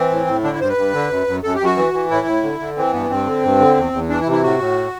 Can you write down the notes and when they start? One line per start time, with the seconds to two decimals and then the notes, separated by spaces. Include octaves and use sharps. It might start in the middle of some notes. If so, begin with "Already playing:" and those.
Already playing: E3 C4
0.11 A2
0.27 A2
0.43 D3 D4
0.52 E4
0.60 G2 C5
0.69 B4
0.77 G2
0.93 D3
1.10 F#2
1.27 F#2
1.43 F#2 A4
1.55 F#2 G4
1.65 F#4
1.77 E3
1.93 E3
2.10 A2 E4
2.26 A2
2.43 D3
2.60 D3
2.76 E3 C4
2.93 G2 B3
3.10 G2 C4
3.26 D3
3.43 G2
3.60 D3
3.77 E2
3.93 E2
4.09 E3 D4
4.21 E4
4.26 C3
4.32 E4
4.43 A2 F#4
4.59 A2